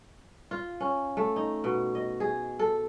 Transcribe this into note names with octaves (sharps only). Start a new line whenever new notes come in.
F4
C#4
A3
D#4
B2
D#5
G#4
A4